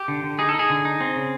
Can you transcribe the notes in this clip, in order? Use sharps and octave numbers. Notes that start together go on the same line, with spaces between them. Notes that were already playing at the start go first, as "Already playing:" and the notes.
Already playing: G4
D3
D3
D#4 G#4
A4
D#4
G#4
D3
D#4
C4
C#3